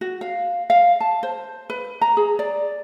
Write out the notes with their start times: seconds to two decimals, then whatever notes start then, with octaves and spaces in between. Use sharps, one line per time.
0.01 F#4
0.21 F5
0.70 F5
1.00 A5
1.23 C5
1.70 B4
2.01 A#5
2.17 G#4
2.39 D5